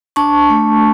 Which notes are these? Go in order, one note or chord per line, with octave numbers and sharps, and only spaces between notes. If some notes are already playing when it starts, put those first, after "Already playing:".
D4 A5 C#6
A3